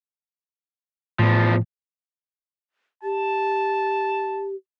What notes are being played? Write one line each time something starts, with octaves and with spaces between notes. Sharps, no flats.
E2 A2 F3
G4 A5